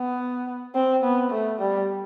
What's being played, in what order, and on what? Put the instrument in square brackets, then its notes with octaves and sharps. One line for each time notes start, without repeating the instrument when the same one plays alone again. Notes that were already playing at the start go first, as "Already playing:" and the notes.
Already playing: [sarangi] B3
C4
B3
A3
G3